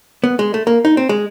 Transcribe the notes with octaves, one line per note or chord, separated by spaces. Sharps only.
B3
G#3
A3
A#3
D#4
C4
G#3